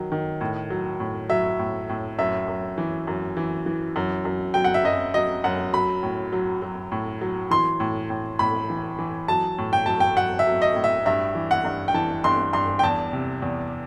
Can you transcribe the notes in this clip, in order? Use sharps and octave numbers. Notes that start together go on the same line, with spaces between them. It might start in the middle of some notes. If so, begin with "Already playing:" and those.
Already playing: D#3 F#3
D#3
A2
F#3
A2
F#3 E5
A2
A2
F#2 E5
F#2
E3
F#2
E3
E3
F#2
F#2
F#3 G5
F#5
E5
F#2 D#5
F#3 D#5
F#2 F#5
F#3 B5
A2
F#3
F#3
A2
F#3
E3 C6
A2
A2
A2 B5
E3
E3
F#3 A5
A2
G5
F#3 A5
G5
F#3 F#5
E5
F#3
D#5
A2
E5
G2 E5
E3
F#5
G2
G5
E3 A5
G2 C6
G2 C6
G5
E2 A5
C3
E2